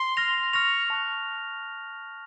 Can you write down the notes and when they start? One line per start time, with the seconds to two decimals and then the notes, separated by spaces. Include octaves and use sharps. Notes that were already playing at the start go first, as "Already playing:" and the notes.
Already playing: C6
0.17 F6 A#6 F7
0.53 C#6 F6 A#6 F7
0.90 A5 C#6 F#6